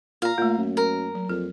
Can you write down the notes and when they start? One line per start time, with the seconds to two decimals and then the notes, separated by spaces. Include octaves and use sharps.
0.22 A#2 F5 A#5
0.38 A#2 A3 A#3
0.58 F#2
0.77 A#4
1.15 F#3
1.29 F2 A#4